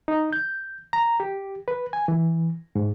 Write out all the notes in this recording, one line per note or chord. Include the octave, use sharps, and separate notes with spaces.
D#4
G6
A#5
G4
B4
G#5
E3
G#2